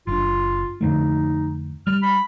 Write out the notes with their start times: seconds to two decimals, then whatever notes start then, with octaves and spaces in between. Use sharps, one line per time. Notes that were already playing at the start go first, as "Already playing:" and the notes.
0.07 F#1 D4 F4
0.81 F2 D3 A3 D#4
1.87 G3 F6
2.02 B5